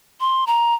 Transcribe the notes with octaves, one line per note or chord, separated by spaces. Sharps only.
C6
A#5